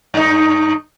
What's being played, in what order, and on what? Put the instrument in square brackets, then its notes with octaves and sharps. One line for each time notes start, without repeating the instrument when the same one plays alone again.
[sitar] G2 D#4